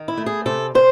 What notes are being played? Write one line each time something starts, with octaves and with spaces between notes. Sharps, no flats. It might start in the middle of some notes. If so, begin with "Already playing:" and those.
Already playing: D#3
E4
A3
G#4
C3 A4
C3 C5